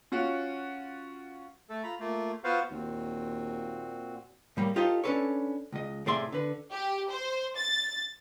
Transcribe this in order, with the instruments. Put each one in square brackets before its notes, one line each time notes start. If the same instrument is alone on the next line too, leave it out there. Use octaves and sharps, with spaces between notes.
[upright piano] C#4 F4 F#4
[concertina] A3 A4
F4 A#5 B5
A3 A#3 F4
B3 F4 F#4 B4 C5 F5
[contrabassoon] D#2 [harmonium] A#2 C4 F#4
[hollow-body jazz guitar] A2 G3 A#3
D#4 F4 G4 A4 C5 D#5
C#4 D4 A4 B4 C#5
C#2 D#5
A2 C3 G#4 D5 E5 C6
D3 B4
[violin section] G4
C5
A6